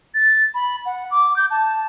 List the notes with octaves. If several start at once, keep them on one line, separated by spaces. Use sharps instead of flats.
A6
B5
F#5
D6
G6
A5